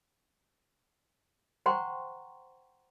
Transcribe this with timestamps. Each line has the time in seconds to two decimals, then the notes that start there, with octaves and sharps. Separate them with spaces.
1.66 C5 F#5 G5 A#5 C6 C#6